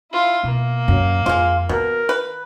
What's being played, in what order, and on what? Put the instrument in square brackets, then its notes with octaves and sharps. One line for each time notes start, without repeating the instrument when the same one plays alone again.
[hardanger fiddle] E4 F4
[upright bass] B2 [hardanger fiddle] A#3
[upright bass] F#2
[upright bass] F2 [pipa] G#3 F4
[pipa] B2 [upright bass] D#3 [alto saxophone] A#4
[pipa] B4